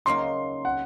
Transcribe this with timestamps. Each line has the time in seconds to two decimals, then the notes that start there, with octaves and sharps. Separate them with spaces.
0.06 C#3 F#3 A#3 D#4 C6
0.65 F#5